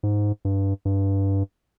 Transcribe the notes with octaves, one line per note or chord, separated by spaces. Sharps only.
G#2
G2
G2